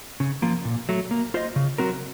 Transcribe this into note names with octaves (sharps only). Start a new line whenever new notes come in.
C#3
F3 A#3 F4
A#2
F#3 A3
A#3
F4 C5 D#5
C#3
F#3 C4 F#4 A#4